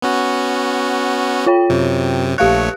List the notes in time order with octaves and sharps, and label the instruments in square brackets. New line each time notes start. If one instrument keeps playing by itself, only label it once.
[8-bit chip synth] B3 C#4 F#4
[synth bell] F4 C#5 G5
[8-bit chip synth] F#2 C3
[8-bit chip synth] A#1 A3 C#5 [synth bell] G4 F5 F#6